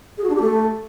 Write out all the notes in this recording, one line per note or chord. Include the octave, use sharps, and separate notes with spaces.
G#4
F#4
D4
G4
A3